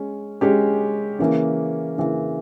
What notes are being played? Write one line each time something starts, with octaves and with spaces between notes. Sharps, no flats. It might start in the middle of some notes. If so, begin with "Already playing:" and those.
Already playing: G#3 C#4
G#3 C#4 G4
C#3 E3 A#3 C#4
C#3 E3 A#3 C#4